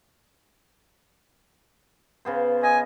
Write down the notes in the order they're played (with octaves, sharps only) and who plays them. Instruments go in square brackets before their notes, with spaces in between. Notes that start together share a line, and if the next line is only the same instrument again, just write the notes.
[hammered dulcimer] C#3 B3 C5
[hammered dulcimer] D#5 [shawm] G#5